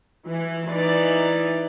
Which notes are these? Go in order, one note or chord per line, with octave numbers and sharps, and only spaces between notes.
E3
E3 D#4 D5